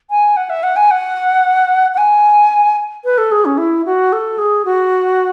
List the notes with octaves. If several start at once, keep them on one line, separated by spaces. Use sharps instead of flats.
G#5
F#5
E5
F#5
G#5
F#5
F#5
G#5
B4
A4
G#4
C#4
E4
F#4
A4
G#4
F#4